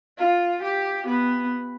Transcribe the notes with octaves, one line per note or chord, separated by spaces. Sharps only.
F4
G4
B3